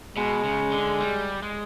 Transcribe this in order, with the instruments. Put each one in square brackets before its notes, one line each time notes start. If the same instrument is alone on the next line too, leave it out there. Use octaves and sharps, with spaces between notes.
[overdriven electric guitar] B2 [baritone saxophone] G#3
[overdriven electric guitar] C#3
D3
G3
G#3